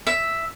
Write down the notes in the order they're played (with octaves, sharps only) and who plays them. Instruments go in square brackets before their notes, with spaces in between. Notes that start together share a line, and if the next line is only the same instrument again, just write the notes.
[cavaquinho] E5